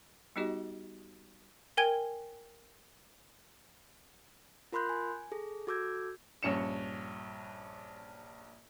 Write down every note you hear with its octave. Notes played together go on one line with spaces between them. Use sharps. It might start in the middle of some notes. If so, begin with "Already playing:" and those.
G3 B3 D#4 F#4 G4 D#5
A#4 G5 G#5 G#6 G7
F4 A#4 B5 C6 F#6 G6
G#5
G#4 A4
F#4 A4 D6 E6 G6 G#6
A#1 G2 C#4 C#7 E7